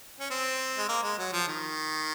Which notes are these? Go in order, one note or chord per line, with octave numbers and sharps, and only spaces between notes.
C#4
C4
G#3
A#3
G#3
F#3
F3
D#3